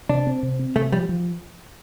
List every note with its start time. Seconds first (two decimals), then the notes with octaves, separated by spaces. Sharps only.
0.09 C3 D4
0.27 C4
0.43 C3
0.59 C4
0.76 C3 A3
0.92 F3 G3
1.09 F3